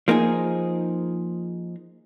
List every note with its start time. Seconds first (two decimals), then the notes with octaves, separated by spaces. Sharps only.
0.08 F3 A#3 D#4 G#4